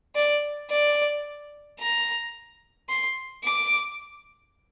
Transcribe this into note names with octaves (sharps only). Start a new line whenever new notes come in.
D5
D5
A#5
C6
D6